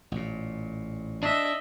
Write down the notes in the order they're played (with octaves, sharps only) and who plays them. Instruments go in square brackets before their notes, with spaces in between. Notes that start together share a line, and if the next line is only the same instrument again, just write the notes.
[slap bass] A1 A#2
[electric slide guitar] D4 [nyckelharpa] D#5 E5